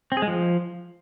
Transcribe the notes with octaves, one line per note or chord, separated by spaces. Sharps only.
C4
G#4
G#3
F3